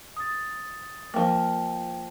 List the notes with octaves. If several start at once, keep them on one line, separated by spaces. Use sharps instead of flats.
D#6 A6
F3 A#3 G5